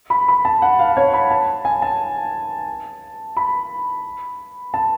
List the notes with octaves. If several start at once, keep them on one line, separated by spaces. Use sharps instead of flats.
B5
B5
A5
F#5
F5
C#5
B5
A5
G#5
A5
B5
A5